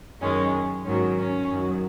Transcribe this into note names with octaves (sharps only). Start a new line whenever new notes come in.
F#2 D#3 G#3 C#4
G#2 D#3 F#3 C#4
C#4
F#2 D#3 F#3